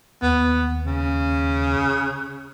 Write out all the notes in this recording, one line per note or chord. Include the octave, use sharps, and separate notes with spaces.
D#2 B3
C#3